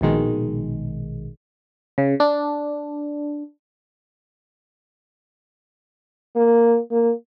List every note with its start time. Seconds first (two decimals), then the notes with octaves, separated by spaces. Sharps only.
0.01 A#1 B2 D#3 G#3
1.98 C#3
2.20 D4
6.36 A#3
6.91 A#3